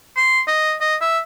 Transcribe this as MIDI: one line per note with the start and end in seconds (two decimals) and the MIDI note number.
0.17 0.41 84
0.47 0.74 75
0.81 0.95 75
1.01 1.19 76